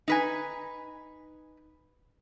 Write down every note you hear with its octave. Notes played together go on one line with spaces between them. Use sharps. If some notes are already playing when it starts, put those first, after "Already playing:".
D#4 B4 G#5